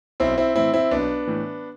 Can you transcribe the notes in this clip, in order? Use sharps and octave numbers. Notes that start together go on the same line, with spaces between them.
B1 C4 E4
C4 E4
A2 E3 C4 E4
C4 E4
B1 B3 D4
A2 E3